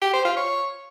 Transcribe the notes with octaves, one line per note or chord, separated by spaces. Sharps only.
G4
C5
F4
C#5